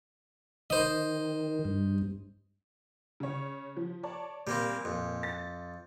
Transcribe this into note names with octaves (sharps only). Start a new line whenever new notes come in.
D#3 C5 D#5
G2
C#3 C#5
F3
C#5 D5 A5
A#2 G3 A#3 C4
F2
A6